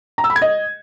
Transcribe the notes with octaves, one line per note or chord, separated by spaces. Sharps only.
A#5
E6
B5
G#6
D#5